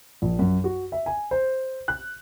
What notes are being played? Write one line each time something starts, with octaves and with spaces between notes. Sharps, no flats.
A#1
F#2
F#4
E5
G#5
C5
F#6